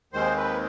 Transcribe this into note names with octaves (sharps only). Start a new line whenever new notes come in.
D#2 D#3 G#3 C4 C5
B4